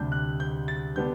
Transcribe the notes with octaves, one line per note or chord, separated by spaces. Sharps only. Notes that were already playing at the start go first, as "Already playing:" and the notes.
Already playing: D2 C3 G3 D4 G6
F#6
G6
A6
D3 G3 B3 D4 G6